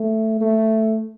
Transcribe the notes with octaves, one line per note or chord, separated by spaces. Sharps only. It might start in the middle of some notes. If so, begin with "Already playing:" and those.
Already playing: A3
A3